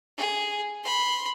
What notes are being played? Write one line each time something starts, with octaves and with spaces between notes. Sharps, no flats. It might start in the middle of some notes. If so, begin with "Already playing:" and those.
G#4
B5 C6